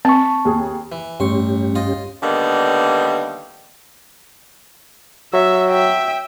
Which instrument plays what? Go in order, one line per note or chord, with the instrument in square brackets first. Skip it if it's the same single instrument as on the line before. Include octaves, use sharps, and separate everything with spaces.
[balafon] C4 [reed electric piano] A5 C#6
[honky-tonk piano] D#2 G#4
[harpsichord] E3
[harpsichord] A1 C6 C#6 [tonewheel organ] G2 C#4 G4
[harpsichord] F4 D#5 D#6
[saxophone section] D3 D#3 G3 A#3 B3
[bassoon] F#3 [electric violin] E5
[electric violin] E5 G5